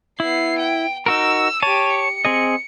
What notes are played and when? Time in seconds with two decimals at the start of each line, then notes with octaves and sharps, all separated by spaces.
0.20 B3 E4 C7
0.59 G5
1.06 D#4 F#4 A#4 E6
1.62 G4 C#5 A5 D#7
1.94 C#7
2.25 C4 G#4 D#5